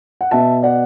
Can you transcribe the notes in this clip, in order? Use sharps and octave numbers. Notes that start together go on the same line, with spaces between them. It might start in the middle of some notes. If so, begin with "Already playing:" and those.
F#5
B2 B3 E5 A5
D5 F#5